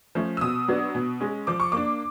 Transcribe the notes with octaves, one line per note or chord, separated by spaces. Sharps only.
F3 A3 C#4
E6
B2 D#6
F#3 B3 D4
B2
G#3 C#4
F3 D6
C#6
A#3 D4 D6